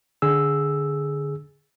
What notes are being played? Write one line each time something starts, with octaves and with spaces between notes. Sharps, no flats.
D3 G#4 E6